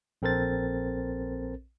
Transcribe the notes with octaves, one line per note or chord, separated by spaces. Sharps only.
A#1 C4 A4 A#4 C5 A6